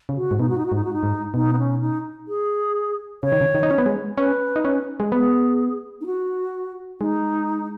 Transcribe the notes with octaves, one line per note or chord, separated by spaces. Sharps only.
C#3
F#4
G#2
B2 D#4
F#4
D#4
F#4
G#2 D#4
F#4
D#4
G#2
B2 D#4
B3
C#4
D#4
G#4
C#3 C#5
D#3
C#3
D#3
D#4
C#4
B3
G#3
C#4 B4
D#4
C#4
G#3
B3 G#4
D#4
F#4
G#3 D#4